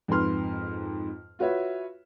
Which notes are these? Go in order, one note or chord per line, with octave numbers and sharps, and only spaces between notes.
F2 G#2 B4 C6 F6
F4 F#4 B4 C#5 E5